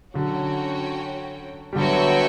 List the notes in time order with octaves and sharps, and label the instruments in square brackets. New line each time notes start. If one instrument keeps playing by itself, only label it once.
[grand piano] D3 F#3 [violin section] C#4 F#4 C#5 G5
[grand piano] G3
[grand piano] D3 F#3 [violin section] B3 F#4 C#5 E5 G5